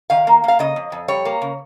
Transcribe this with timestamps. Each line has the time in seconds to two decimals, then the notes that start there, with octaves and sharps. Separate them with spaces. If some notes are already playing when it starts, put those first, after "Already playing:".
0.10 D#3 F5
0.27 A#3
0.44 A#3 F5
0.59 C#3 D#5
0.76 F2
0.92 F2
1.08 G3 C#5
1.25 A#3
1.42 C#3